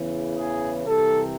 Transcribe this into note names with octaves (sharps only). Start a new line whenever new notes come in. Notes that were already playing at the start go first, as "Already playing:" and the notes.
Already playing: E2 C#3 E3
G#4
C2 C3 E3 A4